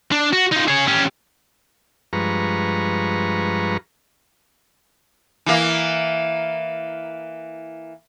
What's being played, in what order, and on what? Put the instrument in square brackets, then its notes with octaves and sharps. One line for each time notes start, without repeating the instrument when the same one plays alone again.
[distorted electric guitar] D4
F#4
D#4 F4
G#4 C#5
C#4 G4
[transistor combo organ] G2 F3 G#3 B4 A#5 C#6
[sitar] E3 A#3